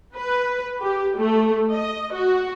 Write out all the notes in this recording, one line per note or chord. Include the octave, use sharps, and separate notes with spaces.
B4
G4
A3
D#5
F#4